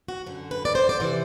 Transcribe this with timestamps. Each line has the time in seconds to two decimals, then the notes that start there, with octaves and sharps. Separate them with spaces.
0.08 F#4
0.26 F#2 D3
0.51 B4
0.65 D5
0.75 C5
0.89 D5
1.00 C3 E3 C5